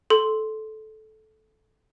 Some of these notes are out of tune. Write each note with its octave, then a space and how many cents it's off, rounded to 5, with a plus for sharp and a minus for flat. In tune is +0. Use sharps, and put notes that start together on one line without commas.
A4 -15 C6 +0